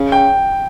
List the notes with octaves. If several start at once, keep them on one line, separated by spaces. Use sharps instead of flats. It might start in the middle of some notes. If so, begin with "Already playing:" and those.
Already playing: C#3
G5